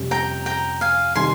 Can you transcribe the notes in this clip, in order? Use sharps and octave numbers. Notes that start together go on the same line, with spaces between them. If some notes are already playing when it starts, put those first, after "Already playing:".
Already playing: F2 C3 G3 C#4
G5 A#5
G5 A#5
F5 G#5
C3 D#3 G3 G#5 C6